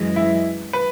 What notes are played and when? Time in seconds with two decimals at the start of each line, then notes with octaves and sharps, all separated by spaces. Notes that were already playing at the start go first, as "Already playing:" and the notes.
Already playing: F#2 E3 G#3
0.16 E4
0.73 B4